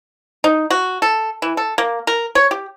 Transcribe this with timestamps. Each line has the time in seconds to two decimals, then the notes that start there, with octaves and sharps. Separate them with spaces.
0.44 D#4
0.70 F#4
1.02 A4
1.42 E3
1.57 A4
1.78 A#3
2.07 A#4
2.35 C#5
2.51 G4